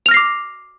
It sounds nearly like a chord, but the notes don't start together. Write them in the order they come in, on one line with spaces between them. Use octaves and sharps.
F7 F6 A#6 C7 D6